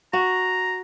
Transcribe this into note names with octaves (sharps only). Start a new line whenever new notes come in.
F#4 A#5